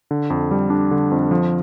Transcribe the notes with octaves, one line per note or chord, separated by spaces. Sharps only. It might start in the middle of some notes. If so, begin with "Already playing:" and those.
D3
F2
G3
D4
D3
F2
F3